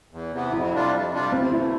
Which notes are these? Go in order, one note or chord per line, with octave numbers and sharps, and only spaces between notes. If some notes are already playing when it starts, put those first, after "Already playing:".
E2
C3 E3 B3
F2 E4
C3 G3 D4 F4
F2
C3 G3 D4 F4
D2 C4
C3 E3 A3 E4